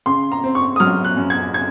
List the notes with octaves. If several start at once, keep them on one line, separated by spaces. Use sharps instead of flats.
C#3 C6
A#5
C4
C#6
D#6
F#3 F6
F#6
F#2
G#6
C#3 G#6